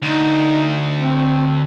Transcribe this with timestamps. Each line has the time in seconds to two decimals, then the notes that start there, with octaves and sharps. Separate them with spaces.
0.02 D2 D#4
0.98 C4